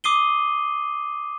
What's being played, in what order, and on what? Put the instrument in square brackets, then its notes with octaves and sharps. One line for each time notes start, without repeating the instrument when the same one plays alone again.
[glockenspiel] D6 D#6 C7 D#7 G7